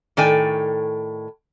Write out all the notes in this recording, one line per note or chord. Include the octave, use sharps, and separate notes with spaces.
A2 D#3 A4 D5 G5 G#5